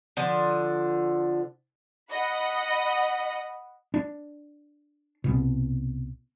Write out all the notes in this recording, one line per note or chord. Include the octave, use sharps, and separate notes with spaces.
D3 F3
D#5 F#5 B5
D4
C2 B2